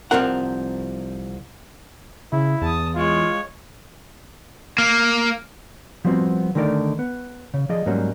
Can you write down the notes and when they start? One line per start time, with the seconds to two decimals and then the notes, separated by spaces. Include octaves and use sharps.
0.11 C2 B2 F3 C4 A#4 F#5
2.32 C#3 E4
2.62 E2 A5 D#6
2.95 G#3 F4 C#5
4.78 A#3
6.05 F3 G3 B3 C4 F#4
6.55 D3 D#3 A3 D#4 A#4 D5
6.99 B3
7.54 C#3
7.69 F3 G#4 D5 D#5
7.86 G#2 F#3 G3 A#3 C#4